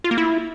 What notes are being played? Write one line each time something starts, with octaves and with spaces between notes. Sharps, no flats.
F4
A#3
E4